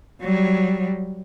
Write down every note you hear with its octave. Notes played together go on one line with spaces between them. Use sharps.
F#3 G3